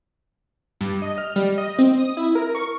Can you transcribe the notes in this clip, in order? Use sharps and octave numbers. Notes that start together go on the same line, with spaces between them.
G2
D#5
F6
G3
D#5
C4
D#6
E4
A#4
C#6